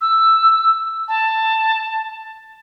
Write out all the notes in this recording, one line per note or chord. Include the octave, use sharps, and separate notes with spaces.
E6
A5